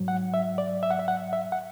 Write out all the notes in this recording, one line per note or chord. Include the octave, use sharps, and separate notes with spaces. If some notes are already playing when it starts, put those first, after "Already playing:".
Already playing: G#2 F#3
F#5
E5
D5
E5
F#5
E5
F#5
E5
F#5